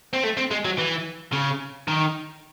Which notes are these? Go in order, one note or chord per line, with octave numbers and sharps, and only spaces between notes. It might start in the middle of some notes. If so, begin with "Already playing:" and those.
C4
A3
C4
G#3
F#3
E3
C#3
D#3